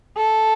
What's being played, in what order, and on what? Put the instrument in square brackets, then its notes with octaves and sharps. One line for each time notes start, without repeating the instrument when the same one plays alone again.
[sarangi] A4